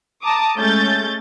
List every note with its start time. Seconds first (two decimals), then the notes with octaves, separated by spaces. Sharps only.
0.22 A5 A#5 D6 D#6
0.58 G#3 A3 C#4 G6 A6